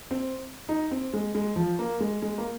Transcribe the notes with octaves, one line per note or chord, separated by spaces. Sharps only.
C4
D#4
C4
G#3
G#3
F3
A#3
G#3
G#3
A#3